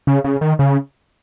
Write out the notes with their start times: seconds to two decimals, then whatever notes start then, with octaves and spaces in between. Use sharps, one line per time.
0.07 C#3
0.24 C#3
0.41 D#3
0.59 C#3